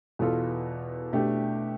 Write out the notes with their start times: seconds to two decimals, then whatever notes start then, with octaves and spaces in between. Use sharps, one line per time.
0.19 E2 B2 B3 F4 A4
1.13 B2 A3 D4 G4